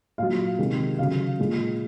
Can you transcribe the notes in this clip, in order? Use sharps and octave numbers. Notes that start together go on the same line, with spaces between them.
A#2 F#3 F5
C3 D#3 G#3
C#3 F#3 F5
A#2 G#3